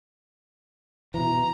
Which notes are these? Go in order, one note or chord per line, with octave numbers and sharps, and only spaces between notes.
B2 E3 A#5